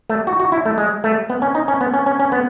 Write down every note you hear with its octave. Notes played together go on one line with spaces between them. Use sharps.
A3
F#4
F#4
E4
A3
G#3
A3
B3
C#4
D#4
C#4
B3
C#4
C#4
C#4
B3